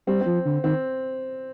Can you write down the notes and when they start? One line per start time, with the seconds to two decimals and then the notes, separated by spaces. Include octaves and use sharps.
0.07 G3 C4
0.21 F3 C4
0.45 D3
0.64 D#3 C4